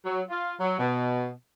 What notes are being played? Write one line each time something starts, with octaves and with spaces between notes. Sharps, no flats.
F#3
F4
F#3
B2